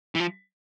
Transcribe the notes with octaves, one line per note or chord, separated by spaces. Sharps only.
E3
F3